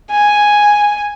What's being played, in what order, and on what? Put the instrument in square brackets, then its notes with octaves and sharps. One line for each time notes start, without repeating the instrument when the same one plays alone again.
[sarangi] G#5